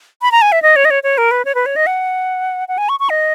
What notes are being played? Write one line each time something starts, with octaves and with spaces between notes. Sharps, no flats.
B5
A#5
G#5
E5
D#5
C#5
D#5
C#5
C#5
A#4
B4
C#5
B4
C#5
D#5
F#5
F#5
G#5
C#6
C#6
D#5